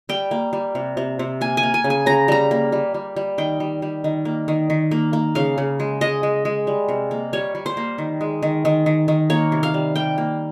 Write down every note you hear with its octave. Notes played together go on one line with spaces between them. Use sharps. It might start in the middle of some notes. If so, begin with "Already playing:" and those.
G3 G5
A#3
G3
C3
C3
C3
A#3 G#5
G#5
A#3
G#5
C#3
G#5
C#3 A#5
G3 A#5
A#3
G3
G3
G3
D#3 G5
G3
G3
D#3
A#3
D#3
D#3
A#3
A#3
C#3 F5
C#3
G#3
G#3 D#5
G#3
G#3
G3
C3
A#3
G3 C#5
G3
C5
A#3
D#3
G#3
D#3
D#3
D#3
D#3
A#3 C#5
C3
F5
G3
G3 G5
A#3